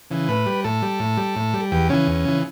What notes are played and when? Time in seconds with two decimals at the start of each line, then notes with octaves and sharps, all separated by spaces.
0.10 C#3 E3
0.28 A2 B4
0.46 G3
0.64 A2 A4
0.82 G3
1.00 A2
1.17 G3
1.36 A2
1.54 G3
1.72 E2 G4
1.90 C#3 E3 C#4
2.07 E2
2.25 C#3 E3